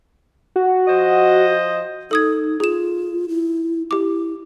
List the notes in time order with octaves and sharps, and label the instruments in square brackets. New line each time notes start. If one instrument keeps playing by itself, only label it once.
[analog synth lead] F#4
[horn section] F3 C5 D#5
[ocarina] D#4 [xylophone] A4 D#6 G#6
[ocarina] F4 [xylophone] G#4 E7
[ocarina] E4
[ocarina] E4 [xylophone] G4 D6